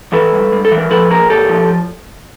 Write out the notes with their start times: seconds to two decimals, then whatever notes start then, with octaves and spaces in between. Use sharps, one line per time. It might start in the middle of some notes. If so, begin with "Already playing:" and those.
0.13 E3 A4 B4
0.32 G2
0.52 G2
0.65 A4
0.71 E3
0.78 A#4
0.91 F3 A4 B4
1.10 A#2 G#4 A#4
1.30 A#2 G4 A4
1.49 F3